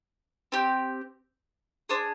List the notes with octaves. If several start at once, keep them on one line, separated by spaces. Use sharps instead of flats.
C4 G4
D4 G#4 C5